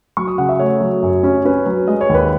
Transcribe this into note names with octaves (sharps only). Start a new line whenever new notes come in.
F#3 C#6
D#6
C#3 F#5
E5
A3 C#5
F#3
F#2
C#4
C#4 B4
F#3
G#3 D#5
C#5
D#2
B4